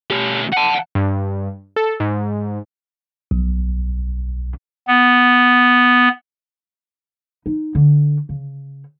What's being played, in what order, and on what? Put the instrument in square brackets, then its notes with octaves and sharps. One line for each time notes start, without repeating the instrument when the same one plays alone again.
[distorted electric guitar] A3 G4
F#5 A5
[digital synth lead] G2
A4
G#2
[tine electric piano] B1
[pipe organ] B3
[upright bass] D#4
D3
C#3